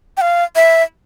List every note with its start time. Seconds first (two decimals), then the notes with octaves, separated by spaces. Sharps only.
0.17 G5
0.21 F5
0.56 E5